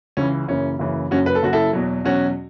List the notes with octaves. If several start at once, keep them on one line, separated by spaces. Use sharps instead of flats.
C#2 C#3 E3 C#4
F#1 F#2 C#3 E3 C#4
F#1 F#2 C#3 E3
F#1 F#2 F#3 C#4 F#4
B4
A4
F#1 F#2 F#3 F#4
E4 A4
E2 B2 F#3
E2 B2 F#3 C#4 F#4